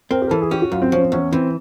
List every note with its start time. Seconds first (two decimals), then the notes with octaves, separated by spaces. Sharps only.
0.11 C4 A#4
0.22 G4
0.27 A#4
0.31 E3 A4
0.41 G#4
0.51 C#4 G4
0.62 F#4
0.72 F#2 F4
0.82 C4
0.92 F3 C#4
1.02 C4
1.12 E2 C#4
1.32 E3 C4